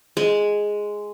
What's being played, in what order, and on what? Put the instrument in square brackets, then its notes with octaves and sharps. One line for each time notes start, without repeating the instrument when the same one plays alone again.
[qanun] G#3